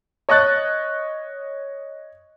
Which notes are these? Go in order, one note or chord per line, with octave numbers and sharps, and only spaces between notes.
C#5 D#5 C#6 F#6 A6